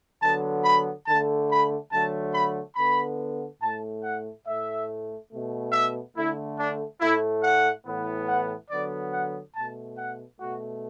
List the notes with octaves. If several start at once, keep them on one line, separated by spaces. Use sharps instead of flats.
D3 F#3 B3 A5
B5
D3 A3 A5
B5
D3 F#3 A3 A5
B5
D3 B3 B5
A2 A3 A5
F#5
A2 A3 E5
B2 A3
E5
D3 A3 E4
D4
A2 A3 E4
F#5
A2 E3 B3
F#5
D3 F#3 B3 D5
F#5
B2 A3 A5
F#5
B2 A3 F#4